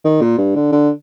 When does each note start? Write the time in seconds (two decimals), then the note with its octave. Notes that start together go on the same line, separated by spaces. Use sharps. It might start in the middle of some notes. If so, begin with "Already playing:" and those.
0.05 D#3
0.21 A#2
0.38 G2
0.55 D3
0.72 D3